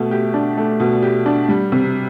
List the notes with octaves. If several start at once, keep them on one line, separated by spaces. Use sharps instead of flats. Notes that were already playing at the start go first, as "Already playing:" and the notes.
Already playing: B2 A3
G4
D4
A3
B2
G4
D4
G3
C3